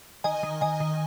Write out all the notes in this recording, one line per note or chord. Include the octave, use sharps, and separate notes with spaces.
D#3 D#5 G#5
D#3
D#3 D#5 G#5
D#3